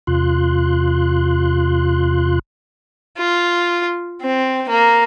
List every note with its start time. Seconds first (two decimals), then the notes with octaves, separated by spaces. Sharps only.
0.07 E2 C3 F4 C6 F#6
3.18 F4
4.22 C4
4.69 A#3